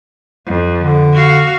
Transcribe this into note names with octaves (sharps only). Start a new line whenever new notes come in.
F2
D3
F#4 F5